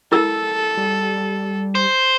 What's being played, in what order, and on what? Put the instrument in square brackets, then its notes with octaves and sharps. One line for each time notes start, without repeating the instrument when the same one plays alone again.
[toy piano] E4 A#4 E6 [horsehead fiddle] A4
[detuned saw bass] G3
[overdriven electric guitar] C5